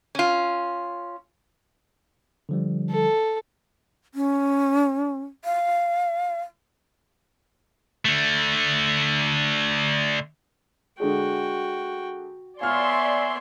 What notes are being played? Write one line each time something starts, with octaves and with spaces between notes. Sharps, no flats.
C#4 F4
D3 F3 G3
A4
C#4
F5
D3 A3
D3 G#3 F#4 G#4 G5
B3 C#5 D5 E5 F5 G#5 C6 F6